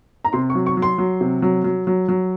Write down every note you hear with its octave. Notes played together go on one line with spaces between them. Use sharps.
A#5
C3 C6
C#6
F#3
C#6
F#3
C6
F#3
C3
F#3
F#3
F#3
F#3